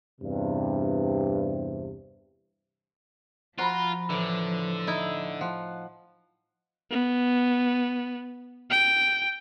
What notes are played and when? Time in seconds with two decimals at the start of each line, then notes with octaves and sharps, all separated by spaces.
0.21 E2 G2 C3
3.58 F3 F4 F#4 C5 A#5 B5
4.10 A2 D3 E3
4.87 D#4 E4
5.41 F3 F#5
6.91 B3
8.70 G5